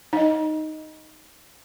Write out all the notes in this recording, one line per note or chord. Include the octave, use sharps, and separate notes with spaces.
D#4 D#5